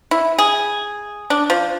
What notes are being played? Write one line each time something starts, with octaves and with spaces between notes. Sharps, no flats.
E4
G#4
D4
F3